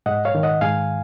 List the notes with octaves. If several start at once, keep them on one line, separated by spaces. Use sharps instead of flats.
G#2 D#5 F#5
C#5 F5
D#3
D#5 F#5
G#2 F5 G#5